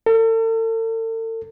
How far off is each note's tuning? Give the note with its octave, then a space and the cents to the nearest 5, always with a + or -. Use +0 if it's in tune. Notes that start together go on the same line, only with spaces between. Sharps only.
A4 +40